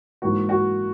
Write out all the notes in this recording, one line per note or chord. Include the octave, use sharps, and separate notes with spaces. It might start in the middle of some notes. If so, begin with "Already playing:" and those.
G#2 E3 A#3 F#4
F#4